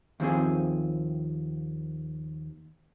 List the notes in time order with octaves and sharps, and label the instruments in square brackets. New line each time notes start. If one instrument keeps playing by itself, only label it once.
[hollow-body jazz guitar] D#2 F3 C4 G#4